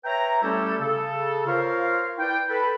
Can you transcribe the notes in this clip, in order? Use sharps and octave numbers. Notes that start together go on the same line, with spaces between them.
B4 C#5 E5 G5 A#5
G3 A3 C#4 E4 G4 A4
C#3 A4
F4 A#4 C5 C#5 F5
E4 B4 D5 G5
A4 B4 B5